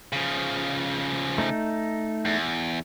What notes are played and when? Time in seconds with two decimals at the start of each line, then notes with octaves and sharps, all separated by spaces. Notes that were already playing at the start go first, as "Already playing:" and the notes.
0.13 C#3 F3
1.38 A3 D#4
2.25 E2